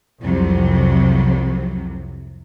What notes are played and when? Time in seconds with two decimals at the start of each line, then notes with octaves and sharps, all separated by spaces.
0.22 C2 F2 C3 F#3